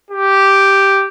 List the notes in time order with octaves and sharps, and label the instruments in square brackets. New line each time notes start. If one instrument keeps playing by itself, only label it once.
[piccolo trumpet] G4